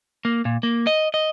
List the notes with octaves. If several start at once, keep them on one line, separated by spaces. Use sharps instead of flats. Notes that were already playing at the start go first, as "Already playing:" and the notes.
A#3
A#2
A#3
D#5
D#5